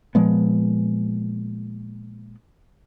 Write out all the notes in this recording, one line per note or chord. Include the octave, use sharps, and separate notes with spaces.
A#2 F3 G#3 B3